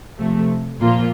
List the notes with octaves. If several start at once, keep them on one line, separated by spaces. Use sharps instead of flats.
C3 F3 A3
A#2 F3 A#3 F4